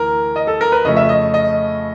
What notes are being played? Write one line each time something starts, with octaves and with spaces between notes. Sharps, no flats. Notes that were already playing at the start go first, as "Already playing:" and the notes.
Already playing: D2 E3 A#4
D#5
A4
A#4
B4
F2 C#3 F3 A3 D#5
E5
D#5
D#5